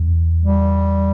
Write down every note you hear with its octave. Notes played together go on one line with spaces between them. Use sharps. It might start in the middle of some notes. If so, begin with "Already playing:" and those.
Already playing: E2
G3